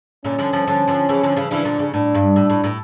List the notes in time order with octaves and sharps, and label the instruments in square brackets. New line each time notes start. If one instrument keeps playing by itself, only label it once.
[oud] A#2 D3 [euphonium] C#4
[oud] D3 F3
D3 F3
[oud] D3 F3 [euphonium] C#4
[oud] D3 F3
C#3 E3
D3 F3
C#3 E3
[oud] C#3 E3 [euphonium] D4
[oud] A#2 D3
C#3
[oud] A2 [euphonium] D4
[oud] G2
A2
A2
A2